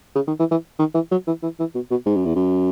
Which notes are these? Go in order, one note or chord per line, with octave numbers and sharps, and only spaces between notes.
C#3
D#3
E3
E3
D#3
E3
F#3
E3
E3
E3
B2
B2
G#2
F#2
E2
F#2